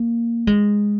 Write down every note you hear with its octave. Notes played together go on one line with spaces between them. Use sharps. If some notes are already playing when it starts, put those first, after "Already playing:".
Already playing: A#3
G#3